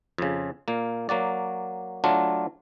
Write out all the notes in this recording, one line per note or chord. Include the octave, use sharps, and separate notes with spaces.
F2 C#3
A#2 A#3
F#3 A#3 F#4 D5
F#3 A3 D4 F4